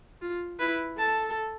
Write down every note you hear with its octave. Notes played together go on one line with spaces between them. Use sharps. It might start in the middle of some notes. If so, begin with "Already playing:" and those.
F4
E4 B4
A4 A5